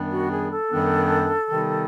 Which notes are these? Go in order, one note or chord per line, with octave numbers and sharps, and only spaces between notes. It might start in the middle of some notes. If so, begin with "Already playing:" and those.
Already playing: F#2 D#3 G3 B3 D4
F#4
G#4
A4
F#2 D#3 G3 B3 D4
C3 D#3 G3 B3 D#4